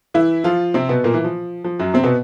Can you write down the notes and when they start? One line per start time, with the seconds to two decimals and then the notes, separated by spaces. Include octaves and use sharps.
0.14 E3 E4
0.44 F3 F4
0.74 C3 C4
0.89 B2 B3
1.04 A#2 A#3
1.14 E3
1.24 F3
1.64 F3
1.79 F#2 F#3
1.94 C3 C4
2.04 B2 B3